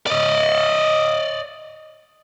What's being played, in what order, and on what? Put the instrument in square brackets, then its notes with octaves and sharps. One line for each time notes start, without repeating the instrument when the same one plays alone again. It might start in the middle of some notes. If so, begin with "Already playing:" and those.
[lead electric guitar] D5 D#5